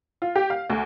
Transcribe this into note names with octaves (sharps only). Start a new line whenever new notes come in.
F4
G4
F5
D2